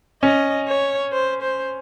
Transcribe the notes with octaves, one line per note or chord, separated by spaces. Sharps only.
C#4 D#5
C#5
C5
C5